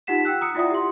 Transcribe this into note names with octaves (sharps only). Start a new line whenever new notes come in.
D#4 F4 G4 F#5 B6 E7
G5 E6 F#6
A#5 D#6 C#7
E4 F4 D5 E5 F#5 D#6
G4 C6